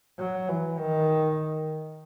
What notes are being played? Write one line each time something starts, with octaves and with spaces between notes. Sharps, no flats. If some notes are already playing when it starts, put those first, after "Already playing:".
F#3
E3
D#3